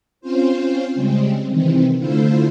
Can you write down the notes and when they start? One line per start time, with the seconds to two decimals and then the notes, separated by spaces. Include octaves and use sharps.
0.21 C4 C#4 F4 C5
0.95 C#3 G3 G#3 C4
1.48 C3 D#3 E3 C4
1.96 D3 A3 E4 F4 C5